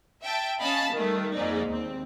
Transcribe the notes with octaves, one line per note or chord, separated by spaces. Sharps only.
E5 G5 A5
C#4 D#5 F5 G#5 A5 B5
D#3 G3 A3
F2 G#2 A#3 D#4 D5
D#2 C4